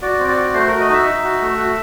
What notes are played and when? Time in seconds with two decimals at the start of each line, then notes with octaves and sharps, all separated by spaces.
0.02 F#4 D5
0.19 C4
0.28 D5
0.37 F#4
0.54 A3 C5
0.67 F#4 A#4
0.80 D#5
0.89 D#4 E5
1.06 D#4
1.24 F#4
1.42 A3
1.59 F#4